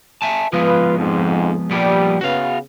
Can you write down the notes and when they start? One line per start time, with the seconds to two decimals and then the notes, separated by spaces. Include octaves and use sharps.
0.22 E5 G#5 A5
0.53 F3 G#3 B3 F4 B4
0.98 F2 G#2
1.71 F3 G3 A#3 B3
2.21 C#3 B3 F#4 F5